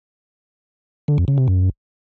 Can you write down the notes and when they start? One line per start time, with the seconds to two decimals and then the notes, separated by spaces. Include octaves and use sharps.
1.08 D3
1.18 F2
1.28 C#3
1.38 C3
1.48 F#2